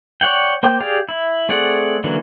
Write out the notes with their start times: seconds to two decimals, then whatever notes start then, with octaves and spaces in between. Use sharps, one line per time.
0.21 C#5 D5 F#5 G5
0.63 A#3 C5 G5 D6 G6
0.80 G4 G#4 D5 F5
1.09 E4
1.49 A3 C4 G#4 D5 F#5
2.04 D3 E3 F#3 A#3 C#4